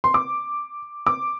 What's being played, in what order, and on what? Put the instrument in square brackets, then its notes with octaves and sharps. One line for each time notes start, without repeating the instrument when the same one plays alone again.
[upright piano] C6
D6
D6